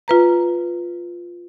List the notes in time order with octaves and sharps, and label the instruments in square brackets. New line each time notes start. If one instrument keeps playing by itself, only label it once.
[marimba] F4 B4 A#5